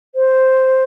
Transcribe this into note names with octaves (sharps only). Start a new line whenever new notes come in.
C5